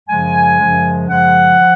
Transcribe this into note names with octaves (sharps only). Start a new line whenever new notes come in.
F#2 C#3 F3 G#3 G#5
F#2 C#3 F3 G#3
F#2 C#3 F3 G#3 F#5
F3